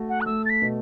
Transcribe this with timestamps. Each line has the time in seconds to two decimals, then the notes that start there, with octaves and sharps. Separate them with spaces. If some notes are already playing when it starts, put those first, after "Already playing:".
Already playing: A3 F#4
0.09 F#5
0.21 F#6
0.26 A3 E6
0.46 A6
0.50 B6
0.62 B2